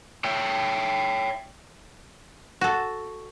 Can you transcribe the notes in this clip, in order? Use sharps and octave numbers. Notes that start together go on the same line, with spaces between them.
C#5 E5 G5
F#4 A4